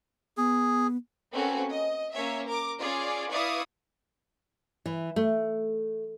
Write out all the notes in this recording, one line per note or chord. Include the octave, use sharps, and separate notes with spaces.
B3 G#4
A#3 C4 C#4 F#4 A4 B4
D#5
A#3 C#4 C#5 E5
A#4 D6
C#4 F4 G#4 D5 F5
E4 B4 D5 F5 C#6 D#6
E3
A3